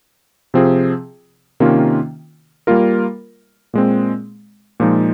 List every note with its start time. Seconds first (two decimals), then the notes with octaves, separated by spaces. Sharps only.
0.54 C3 F3 C4 F4 G#4
1.60 C3 D#3 A#3 C#4 F4
2.67 G3 A#3 F4 A#4
3.74 A#2 G#3 C4
4.80 A#2 F3 G#3 D#4